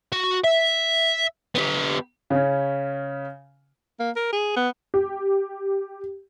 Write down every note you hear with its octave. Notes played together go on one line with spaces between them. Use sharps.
F#4
E5
B3 G4
C#3 C#4
A#3
A#4
G#4
B3
G4